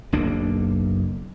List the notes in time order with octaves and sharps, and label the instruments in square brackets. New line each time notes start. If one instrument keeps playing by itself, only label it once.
[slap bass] F#1 B1 A#3 D4